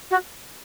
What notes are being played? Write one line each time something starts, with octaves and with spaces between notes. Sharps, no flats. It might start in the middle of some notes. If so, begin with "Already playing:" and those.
F#4